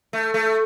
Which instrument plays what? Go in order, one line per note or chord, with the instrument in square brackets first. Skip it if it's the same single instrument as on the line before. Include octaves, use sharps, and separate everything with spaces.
[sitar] A3
A3